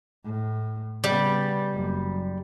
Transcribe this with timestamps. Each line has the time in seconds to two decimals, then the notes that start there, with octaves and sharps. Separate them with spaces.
0.25 A2
1.04 C#3 G3 B3
1.74 F#1 F#2